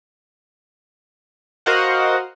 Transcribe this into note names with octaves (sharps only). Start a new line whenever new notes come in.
F#4 A#4 C5 D#5 F5 F#5